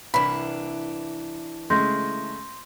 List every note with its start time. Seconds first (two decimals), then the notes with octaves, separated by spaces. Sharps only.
0.14 C2 E3 D4 B5
1.70 C#3 G#3 A3 C6 G6 A#6